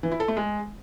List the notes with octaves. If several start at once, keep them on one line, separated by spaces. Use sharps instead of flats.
E3
E4
A4
A3
G#3